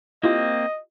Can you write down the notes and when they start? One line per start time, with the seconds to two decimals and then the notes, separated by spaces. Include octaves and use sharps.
0.23 A#3 C4 E4 F4 G4 D#5